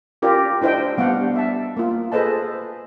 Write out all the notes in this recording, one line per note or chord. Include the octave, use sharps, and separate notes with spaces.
C#4 F4 G4 A#4 D5
D4 E4 C5 D#5 G5
G3 B3 D4 F5 F#5
E5 A5
A#3 F4
G#4 A4 B4 C5 D#5 A5